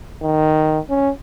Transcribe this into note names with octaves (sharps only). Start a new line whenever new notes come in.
D#3
C#4